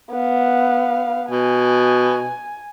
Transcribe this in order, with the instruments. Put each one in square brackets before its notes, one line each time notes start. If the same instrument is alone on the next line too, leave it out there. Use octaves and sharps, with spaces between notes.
[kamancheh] B3 F5
[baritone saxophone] B2 [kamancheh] G#5